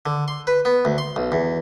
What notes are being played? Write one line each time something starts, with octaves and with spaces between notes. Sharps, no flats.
D3
C6
B4
B3
D2
C6
B1
E2